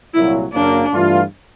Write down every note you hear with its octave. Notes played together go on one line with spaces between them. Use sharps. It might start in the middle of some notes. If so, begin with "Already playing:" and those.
C2 A#2 F#3 E4
F#2 C#3 F#3 A#3 D4
G2 E3 A3 D4 F4